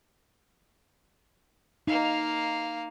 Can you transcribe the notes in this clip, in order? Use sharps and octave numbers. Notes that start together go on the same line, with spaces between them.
A#3 D#4 F5